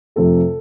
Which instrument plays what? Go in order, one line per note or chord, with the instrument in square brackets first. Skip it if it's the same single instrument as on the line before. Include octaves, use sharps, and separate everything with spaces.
[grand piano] F2 C3 F3 A3 A4